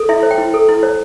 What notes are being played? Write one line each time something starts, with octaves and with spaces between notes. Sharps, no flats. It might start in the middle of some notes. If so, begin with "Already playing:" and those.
Already playing: A4
E4 E5
C5
G5
E4
A4
E4
C5